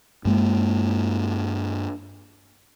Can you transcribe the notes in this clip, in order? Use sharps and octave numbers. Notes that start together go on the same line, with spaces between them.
G2 G#3 A#3